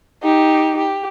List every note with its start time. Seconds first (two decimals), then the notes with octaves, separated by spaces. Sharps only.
0.22 D#4 G4
0.78 G4